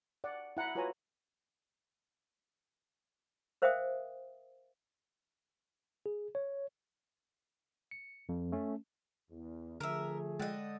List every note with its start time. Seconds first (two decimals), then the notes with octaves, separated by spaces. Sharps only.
0.24 D5 F#5
0.57 E4 F#5 A#5 B5
0.75 F4 F#4 B4 C#5 G#5 A#5
3.62 A#4 C5 E5 F5 G5 D#6
6.06 G#4
6.35 C#5
7.91 C#7
8.29 F2
8.52 A3 C#4
9.31 E2
9.80 D3 F3 A3 G#4 A#4 E5
10.40 D3 G#3 D#5 G5 F#6